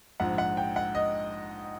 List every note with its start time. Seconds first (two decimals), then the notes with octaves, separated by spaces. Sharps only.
0.20 A#1 G#2 F3 F#5
0.38 F#5
0.57 G5
0.76 F#5
0.95 D#5